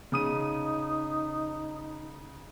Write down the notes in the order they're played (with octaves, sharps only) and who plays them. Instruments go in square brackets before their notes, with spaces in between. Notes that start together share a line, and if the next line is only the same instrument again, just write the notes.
[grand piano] C#3 D#6 D#7 [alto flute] D#4